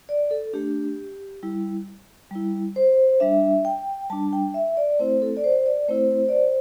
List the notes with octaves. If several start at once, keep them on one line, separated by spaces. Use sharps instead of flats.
D5
A4
A3 D4 G4
G3 E4
G3 E4
C5
G3 D4 E5
G5
G3 D4 A5
G5
E5
D5
A3 C4 E4 C5
A4
D5
C5
D5
A3 C4 E4 C5
D5
C5